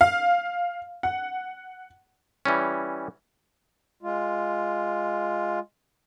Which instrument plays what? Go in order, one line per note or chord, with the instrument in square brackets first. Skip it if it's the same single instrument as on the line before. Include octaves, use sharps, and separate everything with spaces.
[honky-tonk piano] F5
F#5
[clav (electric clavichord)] E3 G3 C#4
[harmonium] G#3 F4